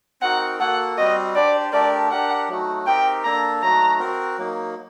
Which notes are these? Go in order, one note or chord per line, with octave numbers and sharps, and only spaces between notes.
C4 D#4 F#4 A#4 F#5
A#3 F#4 A4 F#5
G3 C4 F#4 D#5
D4 G4 C5 D5
A3 D4 G4 A#4 D5
D4 G4 A#4 F#5
F#3 A3 D#4 F#4
C4 D#4 G4 A#4 G5
A#3 D4 A4 A#5
F#3 A3 D#4 F#4 A#5
C4 F#4 A#4
F#3 A#3 D#4